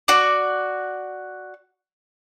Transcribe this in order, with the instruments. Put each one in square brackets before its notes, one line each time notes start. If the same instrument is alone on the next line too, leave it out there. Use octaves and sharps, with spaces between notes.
[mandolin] F#4 D5